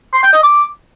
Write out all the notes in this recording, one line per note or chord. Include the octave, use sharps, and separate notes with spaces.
C6
G5
D#5
D6